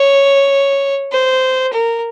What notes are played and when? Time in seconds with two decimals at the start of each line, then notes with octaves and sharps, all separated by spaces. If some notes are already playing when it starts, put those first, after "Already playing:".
Already playing: C#5
1.12 C5
1.73 A#4